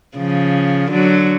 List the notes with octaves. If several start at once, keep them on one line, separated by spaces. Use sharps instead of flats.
C#3 F3
D3 F#3